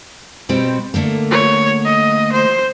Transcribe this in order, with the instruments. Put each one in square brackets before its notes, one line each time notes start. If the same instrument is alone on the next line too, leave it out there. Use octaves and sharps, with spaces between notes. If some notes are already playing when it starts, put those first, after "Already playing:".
[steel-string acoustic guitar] B2 G3 C4
D3 A3 A#3
[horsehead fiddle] C#5
D#5
C5